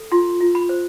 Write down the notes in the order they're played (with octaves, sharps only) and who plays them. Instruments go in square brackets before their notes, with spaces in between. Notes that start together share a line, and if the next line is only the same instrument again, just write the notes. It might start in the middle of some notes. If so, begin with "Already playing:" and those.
Already playing: [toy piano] A4
F4 C6
F4
B5
C5